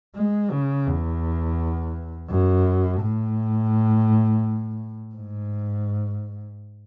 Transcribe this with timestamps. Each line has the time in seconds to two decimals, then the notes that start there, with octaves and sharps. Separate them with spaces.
0.16 G#3
0.52 C#3
0.87 E2
2.29 F#2
3.01 A2
5.15 G#2